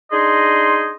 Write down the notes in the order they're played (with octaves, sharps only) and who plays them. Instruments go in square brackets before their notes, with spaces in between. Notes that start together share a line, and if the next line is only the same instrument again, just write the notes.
[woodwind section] D4 D#4 G#4 D#5 C6